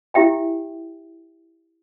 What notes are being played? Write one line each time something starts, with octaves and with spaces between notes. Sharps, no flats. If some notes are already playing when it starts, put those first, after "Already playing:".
E4 G4 E5 G5 G#5